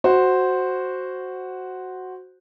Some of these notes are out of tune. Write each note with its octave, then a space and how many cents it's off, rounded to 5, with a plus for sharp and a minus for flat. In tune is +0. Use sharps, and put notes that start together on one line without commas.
F#4 +0 C5 +0